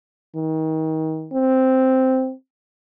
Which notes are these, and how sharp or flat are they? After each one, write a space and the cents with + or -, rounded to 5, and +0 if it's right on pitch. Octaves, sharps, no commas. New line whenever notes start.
D#3 +30
C4 -5